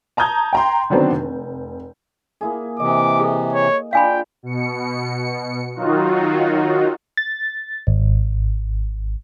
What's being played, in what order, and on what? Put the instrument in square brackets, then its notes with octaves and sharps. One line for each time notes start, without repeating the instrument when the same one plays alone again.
[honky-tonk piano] A5 A#5 D#6 G6 G#6
G5 A#5 C6
D3 D#3 F#3 B3 C4 D4
F1
[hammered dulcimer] A#3 E4 G#4
[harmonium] C3 E3 [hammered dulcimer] D#5 [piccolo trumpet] D6
[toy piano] G#4 A4
[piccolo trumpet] C#5
[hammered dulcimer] D4 F4 C6 [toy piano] F5 G#5 B5 [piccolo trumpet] G5
[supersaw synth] B2 C#7
D#3 F#3 D#4 F4 F#4
[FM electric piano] A6
G#1